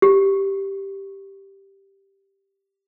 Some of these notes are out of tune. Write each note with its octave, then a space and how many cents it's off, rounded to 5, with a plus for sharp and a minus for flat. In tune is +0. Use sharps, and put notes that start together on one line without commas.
G4 +0